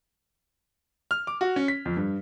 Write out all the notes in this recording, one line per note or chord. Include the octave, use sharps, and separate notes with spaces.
F6
D6
F#4
C#4
B6
F2
G2